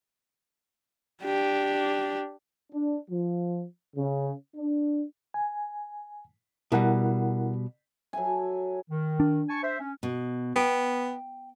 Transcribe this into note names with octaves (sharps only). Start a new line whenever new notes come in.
D4 G4
D4
F3
C#3
D4
G#5
B2 G3 E4 A#4 F#5
F#3 A4 E5 G#5
D#3
D4
G#5 A5 C#6
C5 E5
C#4
B2
B3 G5